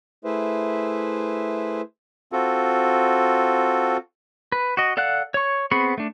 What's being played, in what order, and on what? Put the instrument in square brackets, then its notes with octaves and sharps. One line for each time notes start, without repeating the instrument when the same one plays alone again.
[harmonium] A3 E4 G#4 B4 C5 E5
[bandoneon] C4 F4 F#4 A4
[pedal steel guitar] B4
F#4 D#5
A4 D5 F5 F#5 F#6
C#5 C#6
B3 C4 G#4 B5 C#6
A3 D4